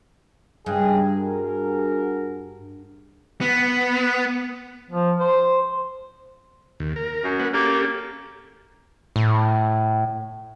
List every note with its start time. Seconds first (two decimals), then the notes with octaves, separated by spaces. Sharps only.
0.66 C#2 G2 G#4
1.16 F#4 G#4 A#4
3.41 B3
4.91 F3
5.19 C5
6.80 D#2
6.96 A#4
7.24 F#2
7.40 A#3 B4 F#5
7.54 A#3 C#4 G4 A4
9.16 A2